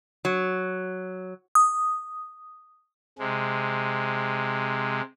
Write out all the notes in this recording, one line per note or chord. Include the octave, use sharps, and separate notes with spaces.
F#3
D#6
C3 G#3